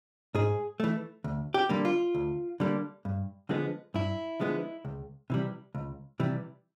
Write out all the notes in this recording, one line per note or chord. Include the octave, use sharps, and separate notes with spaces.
G#2 G#4
E3 A3
D2
G4
D3 G3 A#3
F4
D2
D3 G3 A#3
G2
D3 F3 G#3 B3
G2 E4
D3 F3 G#3 B3
C#2
C3 E3 G3
C#2
C3 E3 G3